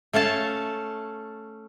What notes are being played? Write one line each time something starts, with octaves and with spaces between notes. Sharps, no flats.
A3 C#4 F5 A5